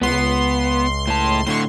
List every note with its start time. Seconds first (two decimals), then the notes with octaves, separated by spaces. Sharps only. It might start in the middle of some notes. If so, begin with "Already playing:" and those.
0.01 C#2 B3 C6
1.07 A2 A5
1.47 A2 D3 C6 C#6